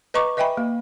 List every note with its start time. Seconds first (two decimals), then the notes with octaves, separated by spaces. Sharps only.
0.14 B4 D#5 A#5 C#6 D6
0.37 B4 D#5 E5 G5 G#5 B5
0.57 A#3